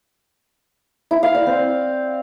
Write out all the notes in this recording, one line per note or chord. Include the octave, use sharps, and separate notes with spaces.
E4
F5
D5
C4